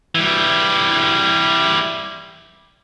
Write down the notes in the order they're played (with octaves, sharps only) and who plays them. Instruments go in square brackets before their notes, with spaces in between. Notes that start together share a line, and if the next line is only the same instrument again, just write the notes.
[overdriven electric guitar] E3 G3